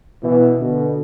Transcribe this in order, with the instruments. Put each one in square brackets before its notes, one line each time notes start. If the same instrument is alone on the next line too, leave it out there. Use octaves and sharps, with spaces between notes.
[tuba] B2 [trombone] E3
[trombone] B2 [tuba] D3